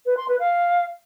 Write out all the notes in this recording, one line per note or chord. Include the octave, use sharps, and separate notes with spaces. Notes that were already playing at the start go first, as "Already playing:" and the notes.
B4
C6
B4
F5